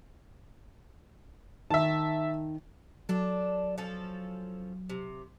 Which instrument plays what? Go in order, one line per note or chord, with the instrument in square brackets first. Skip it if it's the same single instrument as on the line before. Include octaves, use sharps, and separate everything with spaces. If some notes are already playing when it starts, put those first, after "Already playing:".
[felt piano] D#3 [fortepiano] E5 A5
[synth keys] F#3 [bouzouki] D4 A4
[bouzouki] F3 C#4 A4
C3